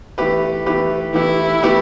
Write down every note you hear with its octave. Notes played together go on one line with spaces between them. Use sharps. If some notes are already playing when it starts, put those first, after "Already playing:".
E3 A3 G4 B4
E3 A3 G4 B4
E3 A3 E4 G4 B4
E3 A3 G4 B4